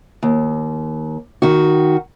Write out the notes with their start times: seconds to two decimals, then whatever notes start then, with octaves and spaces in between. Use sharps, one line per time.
0.23 D#2
1.42 D#3 F#4